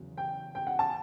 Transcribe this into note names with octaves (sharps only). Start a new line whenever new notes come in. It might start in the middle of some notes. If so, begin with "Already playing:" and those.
Already playing: E2 C#3 F#3
G5
G5
F#5
A5